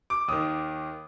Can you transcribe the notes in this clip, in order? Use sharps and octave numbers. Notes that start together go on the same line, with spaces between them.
D6
D#2 D#3 D#6